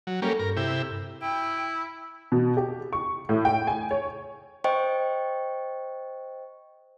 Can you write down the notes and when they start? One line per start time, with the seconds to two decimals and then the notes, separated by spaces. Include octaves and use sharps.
0.07 F#3
0.22 G3 A#3 C#4 G4 A4
0.39 G2 A#4
0.57 C3 E4 G4
1.22 E4 G5
2.32 B2
2.57 G4
2.93 C#6
3.29 A2
3.45 G5
3.67 G#5
3.91 C#5
4.64 C5 D#5 G5 C#6